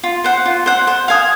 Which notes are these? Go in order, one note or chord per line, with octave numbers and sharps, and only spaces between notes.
F4
C5 F#5
F4
C5 F#5
C5
F5 G#5 D#6